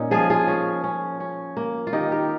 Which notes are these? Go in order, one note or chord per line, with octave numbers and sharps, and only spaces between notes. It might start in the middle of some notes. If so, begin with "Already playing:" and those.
Already playing: A#2 A#3 C#4 D#4
F3 F4 G#4
F4 G#4
C#4
C#4
C#4
A#3
F4
D#3 D#4 G4
G4 A#4